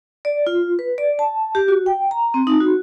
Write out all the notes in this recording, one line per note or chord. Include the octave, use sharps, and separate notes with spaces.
D5
F4
B4
D5
A5
G4
F#4
G5
A#5
C4
D#4
F#4